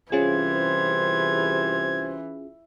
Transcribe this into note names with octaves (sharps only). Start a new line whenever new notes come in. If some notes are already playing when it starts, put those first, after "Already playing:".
C2 E3 C#4 F4 G4 G#4 C5 G#6